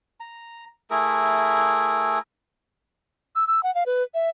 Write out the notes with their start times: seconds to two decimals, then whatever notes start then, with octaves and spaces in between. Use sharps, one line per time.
0.20 A#5
0.90 A3 E4 G#4 A#4
3.36 E6
3.47 E6
3.63 F#5
3.75 F5
3.86 B4
4.14 E5